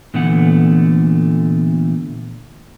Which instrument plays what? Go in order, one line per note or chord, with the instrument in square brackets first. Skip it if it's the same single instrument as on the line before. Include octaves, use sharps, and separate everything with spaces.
[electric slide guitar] A#2 D3 E3 A3 B3 F#5